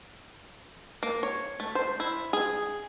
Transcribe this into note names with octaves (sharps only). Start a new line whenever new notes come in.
A#3
C#5
A3
C5
E4
G#4